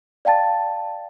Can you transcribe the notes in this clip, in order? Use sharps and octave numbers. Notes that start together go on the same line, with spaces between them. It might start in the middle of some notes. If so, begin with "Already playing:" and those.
D5 F5 G5 A5 A6